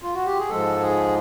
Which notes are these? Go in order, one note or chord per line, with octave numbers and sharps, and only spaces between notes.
F4
F#4
G4
G#4
G#2 F3 G#3 A4
G#4